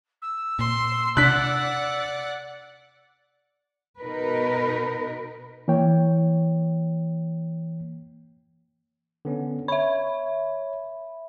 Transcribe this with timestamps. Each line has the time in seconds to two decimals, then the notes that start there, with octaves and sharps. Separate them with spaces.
0.22 E6
0.59 A#2 C6
1.17 C3 D4 D5 F#5 F#6 B6
4.00 B2 D#4 A#4 B4
5.68 E3 A#3 C#5 G5
9.25 D3 B3 C#4
9.68 C#5 E5 B5